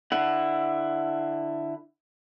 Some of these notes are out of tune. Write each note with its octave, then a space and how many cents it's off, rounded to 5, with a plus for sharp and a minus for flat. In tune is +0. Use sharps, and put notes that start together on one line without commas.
D3 +20 E4 +10 F#5 +10